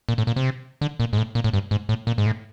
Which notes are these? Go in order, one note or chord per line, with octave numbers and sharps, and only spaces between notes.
A#2
A2
A#2
C3
D3
A#2
G#2
A2
A#2
A2
G2
G#2
A2
A#2
G#2
A2